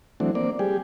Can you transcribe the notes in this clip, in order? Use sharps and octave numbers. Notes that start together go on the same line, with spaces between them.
E3 F#3 A3 C4 D4
A#3 C4 D5
G3 G4 G#4